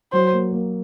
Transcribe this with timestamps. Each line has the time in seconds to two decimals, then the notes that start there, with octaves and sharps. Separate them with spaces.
0.12 F#3 C5
0.32 A#3
0.53 A#3